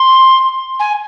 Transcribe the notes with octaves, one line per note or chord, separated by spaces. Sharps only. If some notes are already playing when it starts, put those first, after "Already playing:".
Already playing: C6
G#5